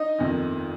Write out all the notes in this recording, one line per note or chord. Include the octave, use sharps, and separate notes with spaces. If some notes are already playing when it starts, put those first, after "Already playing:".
Already playing: D#4 D#5
G1 F2 D#3